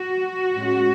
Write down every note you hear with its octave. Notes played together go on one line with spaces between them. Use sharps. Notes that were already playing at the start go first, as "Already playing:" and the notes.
Already playing: F#4
A2 G#3 C#4